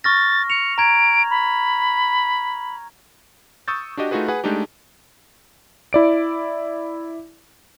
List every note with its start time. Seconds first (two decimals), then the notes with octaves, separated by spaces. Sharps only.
0.04 C#6 F6 A6 A#6
0.50 C#7 F7
0.78 A#5 G#6 D7
1.30 B5
3.68 C#6 D#6 E6 G6 A6
3.97 D4 F#4 G4 D#5
4.11 A3 D#4 F4 F#4 G#4 B4
4.28 G#4 B4 F#5 G#5
4.44 G#3 A3 D4 D#4 G4
5.93 E4 D5 D7